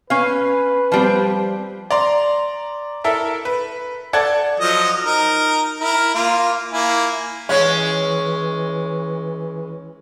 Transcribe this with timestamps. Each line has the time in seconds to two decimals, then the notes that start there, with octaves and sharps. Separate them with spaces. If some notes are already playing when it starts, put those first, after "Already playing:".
0.10 C#4 B4 F5
0.92 F3 G3 C4
1.91 D5 A#5 C6
3.04 E4 A4 A#4 E5
3.45 B4
4.13 A4 D5 F#5 A5 G#6
4.60 F3 F#3 D#5
5.04 D#4 A#4
5.80 E4 A#4
6.14 A#3 F4
6.72 A#3 E4 G#5
7.49 E3 G#3 C#4 C#5